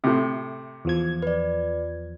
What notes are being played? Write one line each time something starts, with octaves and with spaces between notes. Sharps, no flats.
A2 C3
E2 F3 G#6
B4 D5